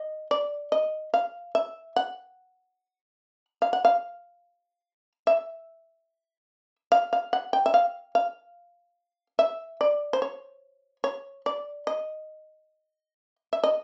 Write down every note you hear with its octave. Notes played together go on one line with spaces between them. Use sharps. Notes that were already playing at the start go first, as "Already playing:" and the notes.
Already playing: D#5
D5
D#5
F5
E5
F#5
F5
F#5
F5
E5
F5
F5
F#5
G5
E5
F5
F5
E5
D5
C5
C#5
C#5
D5
D#5
E5
D#5